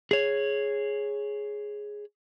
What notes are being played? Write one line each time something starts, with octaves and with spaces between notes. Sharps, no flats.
G#4 C#5